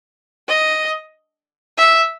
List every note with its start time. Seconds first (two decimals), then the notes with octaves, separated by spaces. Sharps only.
0.48 D#5
1.78 E5